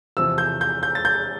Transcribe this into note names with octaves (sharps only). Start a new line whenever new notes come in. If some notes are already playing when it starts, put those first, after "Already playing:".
E2 C3 F3 E6
G6
G6
G6
A6
G6